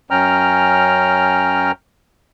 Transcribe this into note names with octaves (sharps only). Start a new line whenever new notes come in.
F#2 C#4 G5 A#5 F6